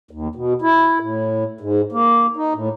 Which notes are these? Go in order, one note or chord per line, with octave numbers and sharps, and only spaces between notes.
D#2
B2
E4
A2
G#2
A#3
D#4
A2